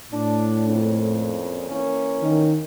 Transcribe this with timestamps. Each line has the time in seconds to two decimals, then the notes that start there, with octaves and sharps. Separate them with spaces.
0.12 A2 D4
0.68 F2 A#2 C#3
1.69 E3 A#3 C#4
2.22 D#3